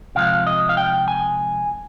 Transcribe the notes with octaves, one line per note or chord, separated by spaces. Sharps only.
C3 F3 G#3 F5
D#5
F5
G5
G#5